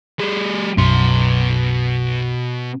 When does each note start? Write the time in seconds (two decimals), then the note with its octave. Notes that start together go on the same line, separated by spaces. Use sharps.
0.19 G3 G#4
0.77 B1 F#2 B2 C6